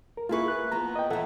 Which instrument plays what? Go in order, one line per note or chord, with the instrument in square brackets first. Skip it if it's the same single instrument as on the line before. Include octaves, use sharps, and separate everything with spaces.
[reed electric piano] A#4
[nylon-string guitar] A#3 E4 B4 [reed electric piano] F4 G#4 C#6
[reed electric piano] F#6
[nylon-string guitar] F3 B3 [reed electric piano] A#5
[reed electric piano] D#5 G5
[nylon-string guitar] E3 F3 [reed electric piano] A4 E5 F#5